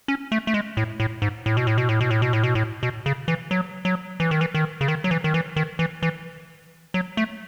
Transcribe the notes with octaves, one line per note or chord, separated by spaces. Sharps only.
C#4
A3
A3
G#3
A2
A2
G#2
A2
B2
A2
B2
A2
B2
A2
B2
A2
B2
A2
B2
C#3
E3
F#3
F#3
E3
D#3
E3
D#3
C#3
D#3
F#3
E3
D#3
E3
D#3
E3
E3
F#3
A3